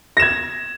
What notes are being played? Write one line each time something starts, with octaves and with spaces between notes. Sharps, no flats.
G#6 A#6 E7